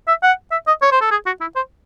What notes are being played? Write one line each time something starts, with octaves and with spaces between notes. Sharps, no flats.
E5
F#5
E5
D#5
C#5
C5
A4
G#4
F#4
E4
C5